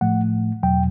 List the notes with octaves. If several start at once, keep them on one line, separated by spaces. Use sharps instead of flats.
A2 F3 A3 F#5
E2 B2 F#3 G5